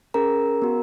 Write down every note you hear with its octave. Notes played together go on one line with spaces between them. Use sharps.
C#4 G#4 A#4 A#5
B3 F#4